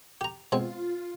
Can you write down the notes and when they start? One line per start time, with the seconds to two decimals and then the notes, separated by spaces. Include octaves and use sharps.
0.21 G4 A#5
0.52 B2 G#3 C4 F4